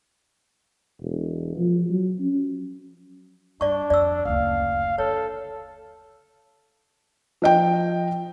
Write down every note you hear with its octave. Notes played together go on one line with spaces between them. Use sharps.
E1
F3
F#3
C#4
G2 D4 D5 C#6
F2 D5 E6
F#1 D2 F5
D3 A4 C#5
F3 D#5 G5